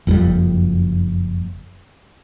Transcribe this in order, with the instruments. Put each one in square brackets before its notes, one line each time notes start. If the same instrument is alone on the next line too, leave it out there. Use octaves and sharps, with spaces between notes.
[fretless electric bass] F#1 F2 A2 G3